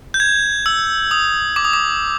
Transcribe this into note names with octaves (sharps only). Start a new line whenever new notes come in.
G6
G#6
E6
D#6
D6
D#6
D6